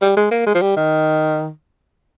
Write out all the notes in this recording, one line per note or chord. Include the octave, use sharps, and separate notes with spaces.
G3
G#3
A#3
G#3
F3
G3
D#3